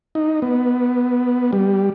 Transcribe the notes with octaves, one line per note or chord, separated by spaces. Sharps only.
D#4
B3
G3